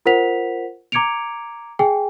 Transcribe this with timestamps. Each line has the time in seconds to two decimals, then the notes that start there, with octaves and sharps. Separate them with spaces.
0.06 F4 A#4 C5 F#5 B6 F7
0.92 A#5 D6 G#6 C#7 D7 F7
1.79 G#4 G5 G#5